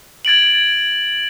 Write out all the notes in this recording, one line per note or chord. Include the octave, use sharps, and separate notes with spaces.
G#6 A6 D7 F#7